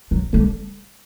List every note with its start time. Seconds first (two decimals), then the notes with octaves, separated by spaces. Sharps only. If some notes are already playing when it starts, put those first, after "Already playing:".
0.11 F#3
0.33 G3 A3